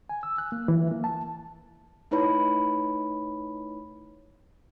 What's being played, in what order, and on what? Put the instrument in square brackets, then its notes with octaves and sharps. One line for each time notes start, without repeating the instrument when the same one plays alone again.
[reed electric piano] G#5
E6
F#6
A#3
E3
A#3
A5
[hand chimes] A3 D#4 E4 B4 C#5 B5